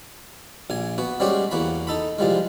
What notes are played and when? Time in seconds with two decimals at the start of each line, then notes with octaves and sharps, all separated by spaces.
0.70 A#1 G#5
0.98 B3 F#4
1.20 G3 G#3 C4 C#4 F#4 G4
1.51 E2 A#3 F#4 B5
1.87 D#4 A4 B5
2.19 C2 F3 G3 G#3